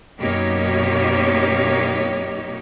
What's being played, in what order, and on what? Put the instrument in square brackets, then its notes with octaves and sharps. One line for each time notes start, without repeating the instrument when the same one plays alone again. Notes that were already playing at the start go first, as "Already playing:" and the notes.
[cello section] F#2 B2 A#3 D#4 G4 C#5